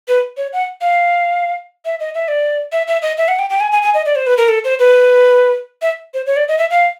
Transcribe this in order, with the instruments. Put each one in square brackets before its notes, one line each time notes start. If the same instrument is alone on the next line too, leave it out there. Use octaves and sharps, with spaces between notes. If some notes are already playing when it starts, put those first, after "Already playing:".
[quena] B4
C#5
F#5
F5
E5
D#5
E5
D5
E5
E5
D#5
E5
F#5
G5
G5
G#5
G#5
G#5
D#5
D5
C5
B4
A#4
A4
C5
B4
E5
C5
C#5
D5
D#5
E5
F5